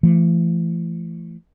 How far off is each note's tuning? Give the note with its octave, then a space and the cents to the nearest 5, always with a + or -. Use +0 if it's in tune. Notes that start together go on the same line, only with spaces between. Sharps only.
E3 +40 A3 +0